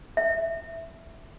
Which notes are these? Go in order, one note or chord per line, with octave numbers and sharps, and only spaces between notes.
E5